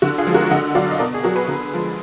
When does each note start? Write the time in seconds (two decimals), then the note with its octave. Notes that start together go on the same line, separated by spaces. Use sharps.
0.02 D3 F#4
0.18 F4 G#4
0.27 F3 G#3
0.34 F#4 A#4
0.50 D3 D#5 F#5
0.75 F#3 D5 F5
0.91 D#5
0.99 B2 A#4 D5
1.14 G#4
1.23 F#3 F#4 A#4
1.36 G#4 B4
1.48 D3
1.73 F3 G#3